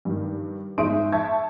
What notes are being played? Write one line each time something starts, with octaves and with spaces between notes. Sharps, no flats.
G2 D#3
G#2 G#3 D#4 E5 C6 D7
E5 A5 C#6 G#6